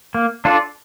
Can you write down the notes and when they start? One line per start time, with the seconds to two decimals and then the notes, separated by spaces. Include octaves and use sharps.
0.14 A#3
0.45 D4 F4 A4 D5